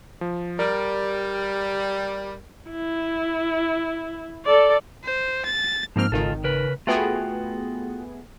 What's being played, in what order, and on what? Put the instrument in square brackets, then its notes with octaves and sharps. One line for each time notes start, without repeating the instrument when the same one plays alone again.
[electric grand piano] F3
[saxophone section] G3 [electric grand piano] A#4 D5
[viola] E4
A4 D5
[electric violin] C5
A6
[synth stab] G#2 F6 [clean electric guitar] F3 A#3 C4
[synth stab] G#1 D#3 [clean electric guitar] C#2 F4 A4
[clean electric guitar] C#3 A#4 B4
[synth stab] A3 B3 G#4 [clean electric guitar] F4 F#4 G5